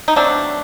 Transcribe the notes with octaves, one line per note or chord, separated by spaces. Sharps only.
D#4
B2 F#3 A3 C4 D4